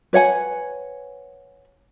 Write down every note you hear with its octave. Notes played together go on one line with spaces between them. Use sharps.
B4 C#5 F#5 G#5